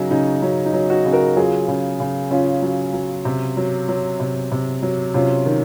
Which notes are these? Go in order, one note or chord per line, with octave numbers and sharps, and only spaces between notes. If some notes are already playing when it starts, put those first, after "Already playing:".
Already playing: C#3 F#3 C#4 D#4
C#3 D#4
F#3 C#4
D#4
F#3
D#4 F#4
C#3
F#4 A#4
F#3 F4 G#4
C#3
C#3
C#3 C#4 F4
F#3
F#3
C3
F#3
F#3
C3
C3
F#3
C3 C#4 F4
D#3